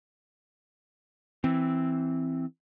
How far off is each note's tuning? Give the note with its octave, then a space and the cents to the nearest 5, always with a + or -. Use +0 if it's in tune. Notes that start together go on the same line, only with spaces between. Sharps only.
E3 +0 C4 +0